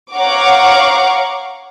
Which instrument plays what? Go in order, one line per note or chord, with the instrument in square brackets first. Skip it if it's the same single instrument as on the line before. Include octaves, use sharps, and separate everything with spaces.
[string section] C#5 F5 F#5 A#5 C#6 D6